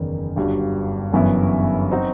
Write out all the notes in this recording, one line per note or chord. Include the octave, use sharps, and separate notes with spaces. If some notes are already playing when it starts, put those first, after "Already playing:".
Already playing: F#1 E2 D#3
G1 G2 F#3
G1 F#2 E3 B3 E4
F#3 C4 D#4 F#4